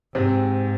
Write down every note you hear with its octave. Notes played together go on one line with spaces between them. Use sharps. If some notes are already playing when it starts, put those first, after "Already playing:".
G#2 C3 C4